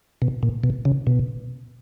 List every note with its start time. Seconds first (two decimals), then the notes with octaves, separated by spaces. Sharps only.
0.22 B2
0.43 A#2
0.64 B2
0.85 C#3
1.07 B2